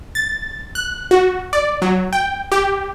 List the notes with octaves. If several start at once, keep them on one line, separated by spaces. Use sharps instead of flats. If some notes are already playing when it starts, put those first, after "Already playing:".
A6
F#6
F#4
D5
F#3
G5
G4